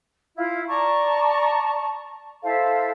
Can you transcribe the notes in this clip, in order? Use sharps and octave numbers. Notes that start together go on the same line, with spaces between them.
E4 F4
D5 A5 A#5 C#6
E4 A4 C5 F5